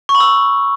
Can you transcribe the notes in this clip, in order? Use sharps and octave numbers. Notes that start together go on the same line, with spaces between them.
C#6
B5
E6